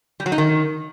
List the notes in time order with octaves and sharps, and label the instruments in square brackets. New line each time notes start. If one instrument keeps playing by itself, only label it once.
[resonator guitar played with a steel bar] G3
F#3
D#4
D#3